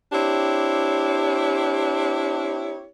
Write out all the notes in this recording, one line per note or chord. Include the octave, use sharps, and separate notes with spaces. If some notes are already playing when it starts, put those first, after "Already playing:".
C4 D4 E4 G4 C#5